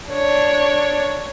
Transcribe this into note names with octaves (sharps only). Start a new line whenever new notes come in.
D4 C#5